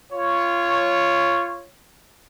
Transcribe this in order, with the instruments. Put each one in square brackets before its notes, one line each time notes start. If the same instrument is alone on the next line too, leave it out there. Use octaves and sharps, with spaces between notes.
[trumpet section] F4 C#5